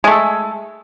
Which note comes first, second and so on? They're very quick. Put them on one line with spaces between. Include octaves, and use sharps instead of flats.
G#3 A3 A4